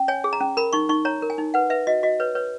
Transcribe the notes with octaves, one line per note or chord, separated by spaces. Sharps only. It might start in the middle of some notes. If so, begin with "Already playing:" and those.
Already playing: C#4
C#5 G#5
G#4
A#5
C#4
A#4 B5
D#4 C#6
D#4 C#6
C#5 A#5
A#4
G#5
D#4
B4 F#5
B4 E5
F#4 D#5
F#4 D#5
B4 C#5
B4 C#5